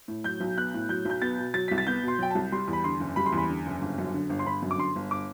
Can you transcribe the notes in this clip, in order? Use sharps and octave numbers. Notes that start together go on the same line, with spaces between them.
A2
F#3 G6
B1
B3 F#6
A2
F#3 G6
B1 G6
B3 A6
B2
F#3 A6
C2 B6
A6
B3 G6
B2 C6
F#3 G5
A5
C2
G3 C6
E2
B5
D3 C6
F#1
G3 B5
C6
E2
B5
D3
F#1
G1
F#2
D3
G1
C6
G1 B5
F#2
D6
D3 C6
G1
D6